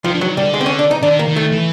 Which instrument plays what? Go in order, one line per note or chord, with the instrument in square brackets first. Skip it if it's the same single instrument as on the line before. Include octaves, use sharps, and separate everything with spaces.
[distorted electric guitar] D#3 [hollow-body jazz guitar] F3
[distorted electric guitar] D3
[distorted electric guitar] D#3 [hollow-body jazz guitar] F#3
[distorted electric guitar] D3 [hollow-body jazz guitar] G3
[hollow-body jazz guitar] G#3
C4
C#4
D4
D#4
[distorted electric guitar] D#3 [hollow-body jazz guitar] D4
[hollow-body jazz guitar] A#3
[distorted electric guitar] D#3
[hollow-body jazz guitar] A3
[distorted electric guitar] E3